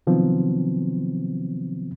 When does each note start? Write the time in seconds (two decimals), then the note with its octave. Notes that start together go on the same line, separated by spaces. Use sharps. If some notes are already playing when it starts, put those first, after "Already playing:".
0.07 C3 D#3 F3 F#3 B3 C4